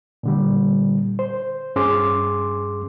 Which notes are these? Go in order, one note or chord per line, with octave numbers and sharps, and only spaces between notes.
A#2 D3 G3
C5
G2 C#4 G#4 C6 D6